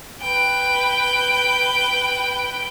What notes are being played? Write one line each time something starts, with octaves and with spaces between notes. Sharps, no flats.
B4 G5